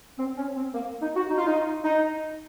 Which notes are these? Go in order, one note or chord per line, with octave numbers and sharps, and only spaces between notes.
C4
C#4
C4
A#3
D#4
F#4
D#4
F4
D#4
D#4